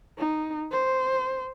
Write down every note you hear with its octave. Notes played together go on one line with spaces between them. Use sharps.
D#4
C5